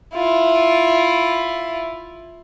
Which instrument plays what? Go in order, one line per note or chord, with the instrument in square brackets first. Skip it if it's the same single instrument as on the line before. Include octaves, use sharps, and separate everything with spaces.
[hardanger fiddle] E4 F4